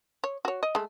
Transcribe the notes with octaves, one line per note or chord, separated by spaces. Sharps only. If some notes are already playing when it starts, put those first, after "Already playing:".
C#5
F#4 C#5
D#5
G#3 A3